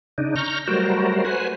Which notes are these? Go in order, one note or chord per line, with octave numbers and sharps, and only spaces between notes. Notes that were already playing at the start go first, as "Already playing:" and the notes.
C#3 D4 D#4
A#5 C#6 F6 G6
F#3 G3 A3 F#4 A#4 C5
B4 C5 F#5 G#5